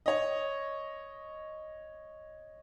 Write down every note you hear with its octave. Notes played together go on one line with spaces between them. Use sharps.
C#5 D#5